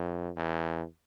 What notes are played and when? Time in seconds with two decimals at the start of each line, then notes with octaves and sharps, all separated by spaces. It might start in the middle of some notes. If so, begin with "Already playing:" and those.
Already playing: F2
0.36 E2